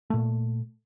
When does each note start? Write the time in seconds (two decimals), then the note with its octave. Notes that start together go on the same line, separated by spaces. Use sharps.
0.10 A#2 A3